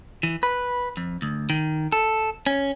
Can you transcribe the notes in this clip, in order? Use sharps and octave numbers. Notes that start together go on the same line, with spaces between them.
E3
B4
F2
D2
D#3
A4
C#4